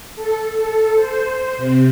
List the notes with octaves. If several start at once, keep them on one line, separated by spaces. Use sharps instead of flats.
A4
A4
C5
C3